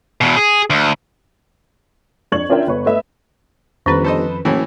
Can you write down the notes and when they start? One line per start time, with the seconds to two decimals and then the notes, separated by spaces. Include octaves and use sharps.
0.21 E2 B2
0.37 G#4
0.70 D2
2.32 F2 D4 C#6 G#6 F#7
2.50 C#4 D4 F4 A#4 E5 G5
2.67 G1 B4 C#5 C#6
2.86 A3 B4 D#5 E5
3.86 G1 F2 D#3 C#4 B4
4.04 A4 C5 D#5
4.45 F#1 A2 E3